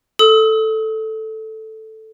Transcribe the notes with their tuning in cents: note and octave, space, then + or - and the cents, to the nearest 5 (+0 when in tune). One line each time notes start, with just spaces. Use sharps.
A4 +0 D#6 +40